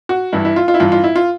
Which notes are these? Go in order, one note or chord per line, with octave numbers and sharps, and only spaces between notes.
F#4
G2 E3 E4
E4
F4
F4
E4
G2 E3 F4
F4
E4
F4